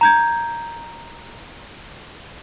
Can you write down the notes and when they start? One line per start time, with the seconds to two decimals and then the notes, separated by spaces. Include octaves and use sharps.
0.01 A#5 G6 G#6